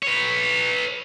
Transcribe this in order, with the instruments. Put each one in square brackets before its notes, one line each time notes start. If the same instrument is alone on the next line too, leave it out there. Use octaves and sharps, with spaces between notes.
[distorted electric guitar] B4 C#5